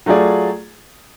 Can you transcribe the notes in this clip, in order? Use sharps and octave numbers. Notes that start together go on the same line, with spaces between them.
F#3 A3 F4 G#4 D5